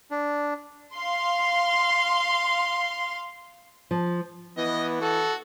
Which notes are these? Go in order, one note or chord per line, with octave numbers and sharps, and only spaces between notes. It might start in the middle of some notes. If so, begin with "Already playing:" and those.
D4
F5 C6
F3
E3 B3 D#5
F#4 A4